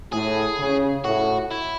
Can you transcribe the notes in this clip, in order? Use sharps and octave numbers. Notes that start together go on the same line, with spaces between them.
A2 G#4
C#3
A2 F#4
E4